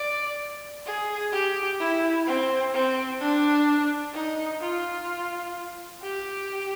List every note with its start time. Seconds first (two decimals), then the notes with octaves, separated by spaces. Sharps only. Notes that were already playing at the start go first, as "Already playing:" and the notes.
Already playing: D5
0.86 G#4
1.33 G4
1.80 E4
2.27 C4
2.74 C4
3.21 D4
4.14 D#4
4.61 F4
6.02 G4